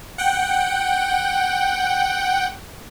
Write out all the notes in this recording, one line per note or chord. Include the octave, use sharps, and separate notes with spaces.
F#5 G5